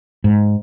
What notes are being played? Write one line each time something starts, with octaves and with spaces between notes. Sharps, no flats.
G#2